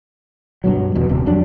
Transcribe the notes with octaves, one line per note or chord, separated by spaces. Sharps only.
G2 B2 F#3
D#1 E2 B2
D#1 C3
F2 F#3 G3 D4